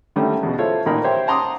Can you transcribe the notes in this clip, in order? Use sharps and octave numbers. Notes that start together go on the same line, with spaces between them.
D3 D#3 G3 A3 C#4 E4
E2 B2
E4 F4 A4 C5 C#5
A1 A#2 D#3 D#4 A#4 B5
G4 C5 C#5 E5 G5
F#5 A5 A#5 C6 D6 D#6